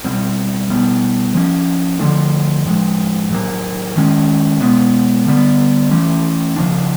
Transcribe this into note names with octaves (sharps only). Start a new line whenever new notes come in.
B2 G3 C4
B2 G3 B3
F3 A#3 C#4
D3 F3 A3 D4
A2 F3 G#3
A2 F#3 A#3
D#3 G#3 C#4
B2 G#3 B3
D3 G3 B3
E3 A3 C#4
C#3 F3 A#3 D4